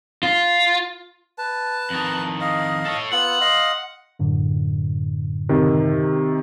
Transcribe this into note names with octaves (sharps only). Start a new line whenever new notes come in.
F4
B4 A5
F2 D#3
D#5 F5
A4 C#5
B3 F4 F#5 E6
D#5 F5 C6
F#2 A2 D3
C3 D#3